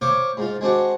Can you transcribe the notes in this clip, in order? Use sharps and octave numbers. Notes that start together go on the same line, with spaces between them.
C5 C#5 F5 C#6 D6
G#2 F4
G#3 C4 D4 F#4